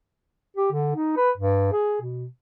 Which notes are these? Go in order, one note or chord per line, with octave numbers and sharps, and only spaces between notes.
G4
D3
D#4
B4
G2
G#4
B2